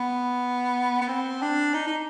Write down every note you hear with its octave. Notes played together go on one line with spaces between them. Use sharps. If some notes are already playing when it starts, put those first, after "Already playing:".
Already playing: B3
B3
C4
D4
D#4
D#4